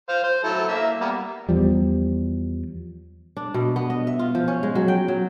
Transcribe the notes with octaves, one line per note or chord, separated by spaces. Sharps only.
C5 F5
C5
F#3 E4 A4
A#3 E5
G3 A#3 B3
E2 F3 G3
D4
B2
B3
D#5
E5
F4
F3
C#4
G#3
F#3
G5
F#3